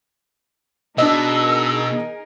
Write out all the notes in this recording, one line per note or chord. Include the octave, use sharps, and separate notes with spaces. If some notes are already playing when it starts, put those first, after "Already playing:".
B2 D4 D#4 G#4 A#4 D#5 E6